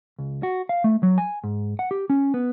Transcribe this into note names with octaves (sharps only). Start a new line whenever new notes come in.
C#2
F#4
F5
A3
F#3
G#5
G#2
F#5
G4
C#4
B3